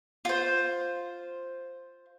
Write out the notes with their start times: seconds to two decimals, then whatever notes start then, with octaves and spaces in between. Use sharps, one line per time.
0.25 F4 C5